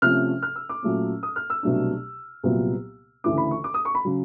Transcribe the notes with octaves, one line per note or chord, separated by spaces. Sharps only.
C3 F3 A3 C#4 F6
F6
E6
D6
A#2 F#3 A3 C#4
D#6
F6
E6
C2 B2 F#3 A3 D4
C2 A#2 F#3 B3
D2 C#3 E3 A3 D4 D6
B5
C#6
D6
D#6
C#6
B5
C#3 F#3